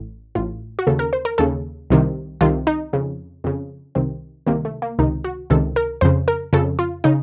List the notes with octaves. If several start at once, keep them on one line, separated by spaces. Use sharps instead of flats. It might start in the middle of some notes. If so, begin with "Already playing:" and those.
Already playing: A1 A2
A1 A2 F4
F#4
D#2 C#3 A4
A#4
C5
A#4
D#2 C#3 A4
C2 C3 D#3
C2 C3 D#3 F4
D#4
F2 C#3
F2 C#3
C2 C3 D#3 C4
C2 C3 D#3 A#3
A3
A#3
C#2 C3 D#3 D#4
F#4
C#2 C3 D#3 A4
A#4
F2 C#3 C5
A#4
F2 C#3 A4
F4
C#3 D#4